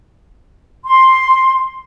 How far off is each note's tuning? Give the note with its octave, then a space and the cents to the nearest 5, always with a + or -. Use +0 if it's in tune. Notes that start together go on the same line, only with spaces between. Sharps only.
C6 +5